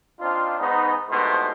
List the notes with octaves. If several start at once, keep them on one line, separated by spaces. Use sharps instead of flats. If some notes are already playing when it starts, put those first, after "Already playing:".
C4 D4 D#4 F4
G#2 B3 D#4
C2 G#2 B2 A3 B3 C5